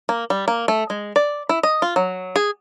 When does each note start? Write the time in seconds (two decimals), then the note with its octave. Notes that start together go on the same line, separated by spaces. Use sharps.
0.09 A#3
0.30 G3
0.48 A#3
0.68 A3
0.90 G#3
1.16 D5
1.49 E4
1.63 D#5
1.82 F4
1.96 F#3
2.36 G#4